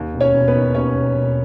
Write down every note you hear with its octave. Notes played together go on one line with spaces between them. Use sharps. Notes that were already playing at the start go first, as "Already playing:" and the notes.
Already playing: D#2
E1
C#4 C#5
E1
B3 B4
D#3
D#2 C#4 C#5
E1
E1